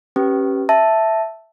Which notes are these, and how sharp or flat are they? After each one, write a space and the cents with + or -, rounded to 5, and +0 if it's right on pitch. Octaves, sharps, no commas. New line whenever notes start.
C#4 -25 G4 -15 B4 +0
E5 +0 A5 +0